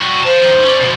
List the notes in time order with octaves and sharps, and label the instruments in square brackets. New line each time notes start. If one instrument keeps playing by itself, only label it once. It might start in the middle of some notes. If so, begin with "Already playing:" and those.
[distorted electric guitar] G3 F#4
[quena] C5 [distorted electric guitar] F5 A5
[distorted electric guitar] D#3 F3
C#4 D5
B2 F3